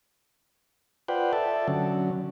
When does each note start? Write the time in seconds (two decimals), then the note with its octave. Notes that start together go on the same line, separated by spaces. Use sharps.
1.08 F4 B4 C5 D5 F#5 G5
1.33 A4 D5 E5 A5
1.68 D3 F#3 C#4